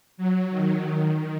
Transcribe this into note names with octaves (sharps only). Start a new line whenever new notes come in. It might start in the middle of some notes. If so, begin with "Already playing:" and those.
F#3
D#3
D#3